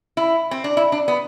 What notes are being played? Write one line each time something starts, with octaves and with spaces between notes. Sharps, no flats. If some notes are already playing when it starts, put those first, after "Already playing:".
E4
C4
D4
E4
D4
B3